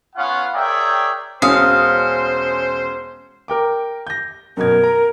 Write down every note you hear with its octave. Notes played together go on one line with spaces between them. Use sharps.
B3 C#4 F4 B4 F5 F#5
G#4 A#4 C#5 D5 E5 G5
E1 C#4 C5 F5 D#6
A#4 G5 D6
G6 A#6
F#2 B2 A#4 G#6
A#5